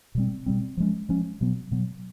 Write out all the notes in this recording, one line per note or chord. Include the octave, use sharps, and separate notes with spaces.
B2 G3 C4
B2 G3 C4
F3 G#3 C#4
F3 G#3 C#4
B2 F#3 B3
B2 F#3 B3